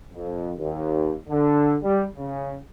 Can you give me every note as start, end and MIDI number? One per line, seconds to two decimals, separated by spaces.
0.13 0.52 41
0.58 1.14 39
1.29 1.74 50
1.83 2.03 55
2.16 2.55 49